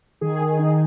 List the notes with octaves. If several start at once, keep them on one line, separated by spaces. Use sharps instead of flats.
D#3 G#4
D#3
D#4